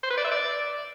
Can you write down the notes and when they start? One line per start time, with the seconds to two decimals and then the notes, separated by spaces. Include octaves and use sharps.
0.03 C5
0.10 B4
0.17 D5
0.24 E5
0.31 D5